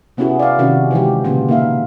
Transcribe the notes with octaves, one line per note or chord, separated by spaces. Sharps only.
C3 B3 C#4 E4 F#4 G#4
D5 F5
C3 D#3 C#4 F#4
E3 F3 G#3 G4
A#2 C#3 B3 F4
A#3 D#4 E5 F5